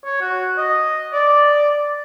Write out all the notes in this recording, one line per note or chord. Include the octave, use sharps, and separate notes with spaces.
C#5
F#4
D#5
D5